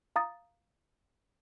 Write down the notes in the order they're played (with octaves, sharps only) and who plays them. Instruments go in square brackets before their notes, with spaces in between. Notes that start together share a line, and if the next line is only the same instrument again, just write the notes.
[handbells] F5 A#5 D#6 A6